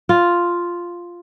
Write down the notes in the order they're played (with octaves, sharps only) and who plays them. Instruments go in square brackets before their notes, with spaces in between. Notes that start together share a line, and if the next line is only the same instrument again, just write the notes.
[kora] F4